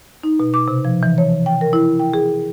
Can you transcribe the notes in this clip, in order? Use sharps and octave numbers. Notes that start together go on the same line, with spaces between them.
D#4
B2
D6
C3
F3
E3
C#5
G5
A#4
E4
G5
G#4